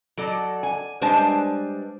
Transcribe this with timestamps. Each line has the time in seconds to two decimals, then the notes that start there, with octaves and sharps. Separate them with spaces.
0.17 F#3 A4 D5
0.63 G#5
1.01 G3 G#3 D4 B4 C5 A5